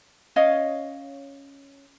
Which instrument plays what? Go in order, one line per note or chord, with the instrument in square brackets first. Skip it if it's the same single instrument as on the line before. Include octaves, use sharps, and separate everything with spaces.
[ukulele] C#4 C#5 D#5 F5